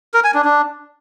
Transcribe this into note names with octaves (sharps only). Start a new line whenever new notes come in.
A#4
G#5
D4
D4